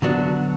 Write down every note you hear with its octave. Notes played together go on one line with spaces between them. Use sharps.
D3 F#3 B3 D4 F#4